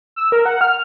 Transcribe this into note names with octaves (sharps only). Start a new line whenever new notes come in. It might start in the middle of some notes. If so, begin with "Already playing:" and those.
E6
A#4
F#5
F6